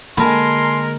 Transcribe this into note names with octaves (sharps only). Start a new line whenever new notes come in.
D3 G#3 A#3 A#4 G#5 A5 B5 C6